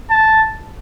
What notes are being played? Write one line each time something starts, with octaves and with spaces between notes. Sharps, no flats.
A5